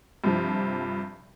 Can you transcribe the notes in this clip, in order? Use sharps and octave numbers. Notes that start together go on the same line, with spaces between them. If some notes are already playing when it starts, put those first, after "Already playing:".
G2 C3 F3